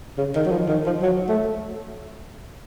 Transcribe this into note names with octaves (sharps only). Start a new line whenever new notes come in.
C#3
D#3
F#3
F3
D#3
F3
F#3
A3